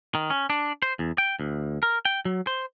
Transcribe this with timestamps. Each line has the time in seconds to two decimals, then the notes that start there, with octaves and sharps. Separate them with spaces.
0.15 D#3
0.30 C#4
0.50 D4
0.82 C5
0.99 E2
1.18 G5
1.40 D2
1.83 A#4
2.05 G5
2.25 F#3
2.47 C5